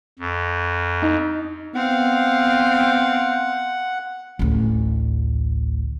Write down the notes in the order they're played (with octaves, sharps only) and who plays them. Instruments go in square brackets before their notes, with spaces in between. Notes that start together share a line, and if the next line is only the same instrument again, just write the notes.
[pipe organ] F2
[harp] D#4
[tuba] B3 [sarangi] C4 [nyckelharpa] F5 [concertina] F#5
[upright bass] A1 D2